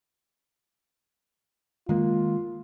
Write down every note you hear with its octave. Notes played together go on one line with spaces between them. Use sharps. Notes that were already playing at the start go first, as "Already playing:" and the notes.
D#3 G#3 A#3 F4